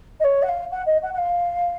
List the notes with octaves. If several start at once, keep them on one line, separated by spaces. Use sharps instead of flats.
D#5
C#5
F#5
F5
F#5
D#5
F#5
F#5
F5